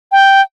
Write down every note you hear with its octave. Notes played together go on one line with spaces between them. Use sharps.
G5